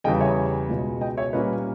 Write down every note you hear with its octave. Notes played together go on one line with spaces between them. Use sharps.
E2 C#3 G3 D#5 G5
C#5 E5
C#2 B2 G#3
D#5 G5
C#5 E5
A#2 G3 A#3 C#4 B4 D#5